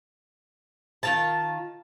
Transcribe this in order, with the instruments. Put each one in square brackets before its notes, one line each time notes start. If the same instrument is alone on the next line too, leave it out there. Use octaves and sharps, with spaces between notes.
[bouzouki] D#3 F4 A5